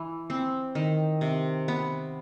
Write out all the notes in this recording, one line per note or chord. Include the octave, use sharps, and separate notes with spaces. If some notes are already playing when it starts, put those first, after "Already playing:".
Already playing: E3
C4
D#3
C3
B3